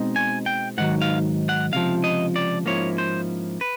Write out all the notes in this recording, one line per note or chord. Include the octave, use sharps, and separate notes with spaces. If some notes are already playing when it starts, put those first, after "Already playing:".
Already playing: B2 G#3 C4 D#4
G#5
G5
G#2 D#3 F#3 F#5
F5
F#5
C#2 C3 F3 F5
D#5
D5
G#2 F3 A#3 C#4 E4 C#5
C5
B4